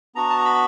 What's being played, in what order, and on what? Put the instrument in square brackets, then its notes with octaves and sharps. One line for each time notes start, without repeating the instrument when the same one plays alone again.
[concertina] B3 D4 F#4 A#5
A5
A#5
B5